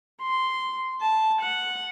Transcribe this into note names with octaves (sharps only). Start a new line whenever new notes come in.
C6
A5
F#5